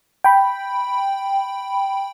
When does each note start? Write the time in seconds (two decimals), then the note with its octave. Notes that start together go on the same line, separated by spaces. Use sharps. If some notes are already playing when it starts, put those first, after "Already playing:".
0.24 G5 B5